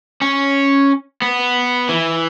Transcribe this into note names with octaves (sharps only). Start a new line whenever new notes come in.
C#4
B3
E3